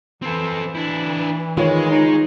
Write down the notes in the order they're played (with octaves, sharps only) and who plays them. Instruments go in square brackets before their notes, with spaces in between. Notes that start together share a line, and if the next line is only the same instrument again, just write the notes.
[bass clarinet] E3 [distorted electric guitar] C4 A4
[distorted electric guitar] D4 E4
[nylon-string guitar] D#3 [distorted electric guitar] G#3 [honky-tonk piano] F4 C#5
[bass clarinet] D#4